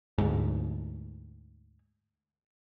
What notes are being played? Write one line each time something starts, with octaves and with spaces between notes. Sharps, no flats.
D2 G#2